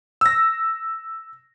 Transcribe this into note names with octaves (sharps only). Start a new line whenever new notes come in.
E6 A#6